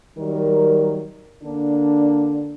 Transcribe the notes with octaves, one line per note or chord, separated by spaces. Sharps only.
D#3 F#3 G3 A#4
D3 A#3 D4